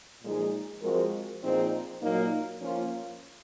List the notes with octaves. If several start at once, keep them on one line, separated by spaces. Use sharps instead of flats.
A#2 F3 G#3 D#4 G#4
F3 G#3 C4 F#4 A#4
A#2 F3 C4 D#4 G#4
A#2 F#3 A#3 D#4
F3 A#3 C#4 F4